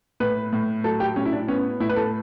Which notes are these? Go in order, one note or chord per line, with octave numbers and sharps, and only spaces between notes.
A2 B4
A2
F#3 A4
G4
A2 C#4
E4
D4
B3 C#4
A2 E4
B4
A4